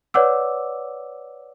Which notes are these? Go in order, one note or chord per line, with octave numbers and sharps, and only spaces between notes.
B4 C#5 D5 F#5 D6 E6